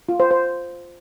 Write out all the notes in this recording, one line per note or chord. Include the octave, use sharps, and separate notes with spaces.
F4
C5
C5